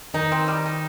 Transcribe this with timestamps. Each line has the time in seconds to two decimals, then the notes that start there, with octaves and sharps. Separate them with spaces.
0.14 D#3 D#4
0.32 C4
0.48 G3
0.65 D#4